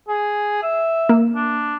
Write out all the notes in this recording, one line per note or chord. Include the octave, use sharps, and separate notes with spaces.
G#4
E5
A#3
D4